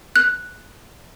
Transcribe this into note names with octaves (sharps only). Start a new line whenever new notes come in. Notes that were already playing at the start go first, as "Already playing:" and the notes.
F#6